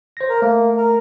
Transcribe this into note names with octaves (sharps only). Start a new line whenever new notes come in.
C5 A#6
A#4
A3 A#3
A#4